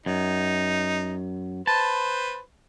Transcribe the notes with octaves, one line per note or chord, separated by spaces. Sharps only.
F#2 D#4
B4 C5 A5